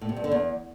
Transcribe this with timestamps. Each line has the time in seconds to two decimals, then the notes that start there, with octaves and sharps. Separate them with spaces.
0.01 A2
0.09 C3
0.16 G2
0.24 D3
0.31 E2